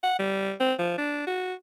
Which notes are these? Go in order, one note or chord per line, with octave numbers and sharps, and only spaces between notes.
F#5
G3
C4
F3
D4
F#4